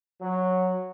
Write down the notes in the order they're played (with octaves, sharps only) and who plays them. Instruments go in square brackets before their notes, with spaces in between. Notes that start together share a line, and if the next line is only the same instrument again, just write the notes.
[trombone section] F#3